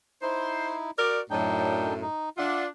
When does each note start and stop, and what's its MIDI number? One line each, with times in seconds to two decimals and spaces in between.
0.22 0.91 63
0.22 0.91 64
0.22 0.73 72
0.98 1.20 66
0.98 1.20 70
0.98 1.20 74
1.30 2.03 42
1.30 2.03 45
1.30 1.94 62
1.30 1.94 63
1.30 1.94 79
2.02 2.29 63
2.38 2.67 62
2.38 2.67 65
2.38 2.63 76
2.38 2.63 78